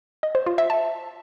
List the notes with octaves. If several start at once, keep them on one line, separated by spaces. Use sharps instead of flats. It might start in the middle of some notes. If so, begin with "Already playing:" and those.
D#5
C5
F4
E5
A5